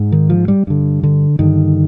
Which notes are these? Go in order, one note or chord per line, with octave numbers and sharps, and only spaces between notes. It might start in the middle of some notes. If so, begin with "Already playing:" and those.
Already playing: G#2
D#3
F3
G3
G2 D3
D3
G2 D3 D#3